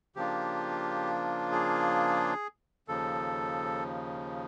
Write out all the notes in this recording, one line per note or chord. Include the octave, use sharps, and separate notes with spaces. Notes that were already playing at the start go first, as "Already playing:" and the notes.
C#3 F3 A#3 D4 F4 G4
G#4
D#2 C#3 F3 A4